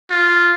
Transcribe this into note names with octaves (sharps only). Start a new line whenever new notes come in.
F4